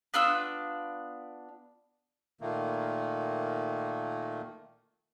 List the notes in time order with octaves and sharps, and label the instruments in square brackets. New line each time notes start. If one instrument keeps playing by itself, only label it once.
[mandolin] B3 D4 F4 E6
[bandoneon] A#2 D#3 A3 A#3